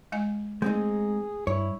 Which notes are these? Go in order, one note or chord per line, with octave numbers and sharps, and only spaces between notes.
G#3 D#5 G#5
G#3 A3 C4 D#4 G#4
G2 E4 C#5